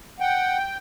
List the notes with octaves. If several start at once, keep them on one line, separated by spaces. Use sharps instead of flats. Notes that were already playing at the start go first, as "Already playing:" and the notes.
F#5 G5